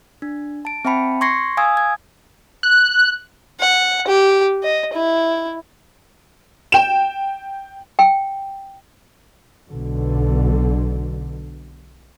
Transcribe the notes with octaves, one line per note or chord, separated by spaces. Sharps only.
D4
A5 D7
C4 E5 G5 A5 B5 C#7
C6 C#6 G#6 A#6 C7 C#7
F5 G#5 D#6 E6 G#6
G#6
F#6
F#5
G4
D#5
E4
G5 E7
G5
B1 B2 D3